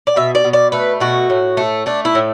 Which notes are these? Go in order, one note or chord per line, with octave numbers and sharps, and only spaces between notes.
D5
B2 E5
D5
B2
D5
A3 B4
B2 F#4
A2
A3
A3 D4
E4
A2